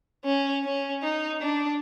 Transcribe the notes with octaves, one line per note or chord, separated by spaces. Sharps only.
C#4
C#4
D#4
D4